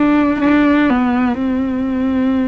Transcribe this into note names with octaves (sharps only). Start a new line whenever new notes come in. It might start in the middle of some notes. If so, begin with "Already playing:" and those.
Already playing: D4
D4
B3
C4